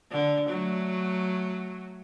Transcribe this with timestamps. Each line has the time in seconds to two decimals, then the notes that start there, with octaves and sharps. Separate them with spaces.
0.11 D3
0.49 F#3 A3